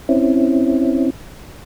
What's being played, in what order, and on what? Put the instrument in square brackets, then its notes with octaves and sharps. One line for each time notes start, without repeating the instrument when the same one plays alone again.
[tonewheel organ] C4 C#4 E4